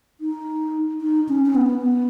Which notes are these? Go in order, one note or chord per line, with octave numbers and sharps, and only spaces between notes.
D#4
D#4
C#4
C#4
B3
B3